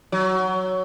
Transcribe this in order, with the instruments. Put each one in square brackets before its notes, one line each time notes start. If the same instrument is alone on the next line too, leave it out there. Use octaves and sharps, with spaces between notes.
[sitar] F#3